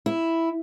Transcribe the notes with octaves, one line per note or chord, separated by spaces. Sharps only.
E4